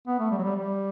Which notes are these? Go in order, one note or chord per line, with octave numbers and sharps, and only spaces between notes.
B3
A3
G3
F#3
G3
G3